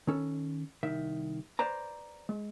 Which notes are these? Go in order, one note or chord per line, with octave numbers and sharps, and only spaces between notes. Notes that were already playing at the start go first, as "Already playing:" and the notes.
D#3 C#4 A4
C2 D#3 E5
B4 C5 D5 A#5
G#3